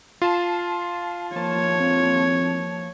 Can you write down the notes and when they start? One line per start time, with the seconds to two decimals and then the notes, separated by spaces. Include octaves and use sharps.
0.22 F4 A5 C7
1.36 F3 A#3 C#5 A5
1.79 F2